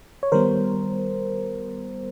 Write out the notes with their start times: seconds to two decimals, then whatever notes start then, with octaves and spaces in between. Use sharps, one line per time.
0.23 C#5
0.32 D#3 G3 B3 A#4 C5